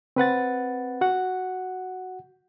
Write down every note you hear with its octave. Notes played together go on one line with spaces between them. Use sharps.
C4 B4 F#5 A6
F#4 F#5